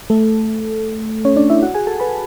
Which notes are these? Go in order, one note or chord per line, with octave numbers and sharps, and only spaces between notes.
A3 A4
C#4 C#5
D4 D5
E4 E5
F#4 F#5
G#4 G#5
A4 A5
B4 B5